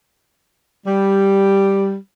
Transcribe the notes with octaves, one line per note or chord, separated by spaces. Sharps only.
G3